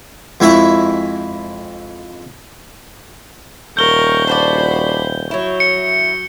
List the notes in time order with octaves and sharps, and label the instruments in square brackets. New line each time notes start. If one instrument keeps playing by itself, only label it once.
[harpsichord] F2 G#3 E4 E5 C#6
[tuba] D#1 [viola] A#4 C#6 [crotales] G6 G7
[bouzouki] D4 F#4 D5 [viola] C5 B5
[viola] F#3 [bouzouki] E4 C#5
[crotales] C#7